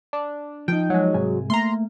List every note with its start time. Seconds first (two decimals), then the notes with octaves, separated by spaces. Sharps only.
0.13 D4
0.68 F3 D#4 G5
0.90 F#3 G#3
1.14 C2 G#2 G#5
1.50 A3 A#3 A#5 C6